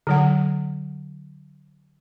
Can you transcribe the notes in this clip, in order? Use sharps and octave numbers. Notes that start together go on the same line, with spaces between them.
D3 F#3 F#5